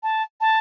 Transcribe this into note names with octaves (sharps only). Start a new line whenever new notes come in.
A5
A5